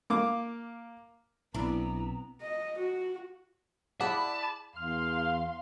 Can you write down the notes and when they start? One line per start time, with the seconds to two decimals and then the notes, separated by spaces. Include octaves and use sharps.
0.10 A#3 D6
1.54 B1 B3 C4 D4 E4 A#5
2.42 D#5
2.78 F#4
4.01 E4 G#4 D5 F#5 A5 B5
4.76 E2 F5 C6 F6